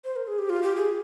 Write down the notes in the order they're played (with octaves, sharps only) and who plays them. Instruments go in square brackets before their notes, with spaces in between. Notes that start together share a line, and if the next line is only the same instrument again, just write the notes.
[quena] C5
A#4
G#4
G4
F4
G4
G#4